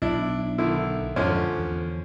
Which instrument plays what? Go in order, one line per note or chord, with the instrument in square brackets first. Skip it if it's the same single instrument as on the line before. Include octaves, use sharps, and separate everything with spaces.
[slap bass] B1 [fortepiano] D4 E4
[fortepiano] D3 D#3 E4
[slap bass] F2 G#2 [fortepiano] D3 F3 C#4
[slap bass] E2